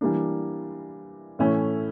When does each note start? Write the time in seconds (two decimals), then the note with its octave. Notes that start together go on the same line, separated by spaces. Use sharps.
0.01 E3 G3 A#3 D4
1.39 A2 E3 A3 C#4 E4